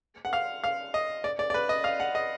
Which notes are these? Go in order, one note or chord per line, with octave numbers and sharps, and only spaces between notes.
F#5
F5
F5
D#5
D5
D5
D5
B4
D#5
F5
F#5
D#5